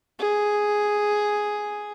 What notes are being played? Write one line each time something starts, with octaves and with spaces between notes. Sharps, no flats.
G#4